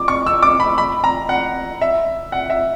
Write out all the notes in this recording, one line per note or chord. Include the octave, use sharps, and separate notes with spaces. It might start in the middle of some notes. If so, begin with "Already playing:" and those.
Already playing: D6
C#6
E6
D6
B5
B5
A#5
F#5
E5
F#5
E5